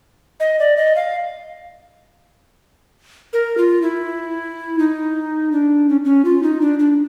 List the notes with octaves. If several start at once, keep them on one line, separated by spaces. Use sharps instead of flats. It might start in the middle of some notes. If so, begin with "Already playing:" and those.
D#5
D5
D#5
F5
A#4
F4
E4
D#4
D4
C#4
C#4
F4
D#4
D4
D4